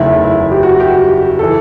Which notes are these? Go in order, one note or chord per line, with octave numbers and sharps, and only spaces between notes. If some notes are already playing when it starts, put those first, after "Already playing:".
Already playing: F#1 E2 D#3 A3 E4
E4
G4
F#4
G4
F#4
E3 A4